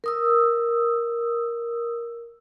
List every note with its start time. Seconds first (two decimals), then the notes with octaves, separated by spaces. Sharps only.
0.04 A#4 D#6 E6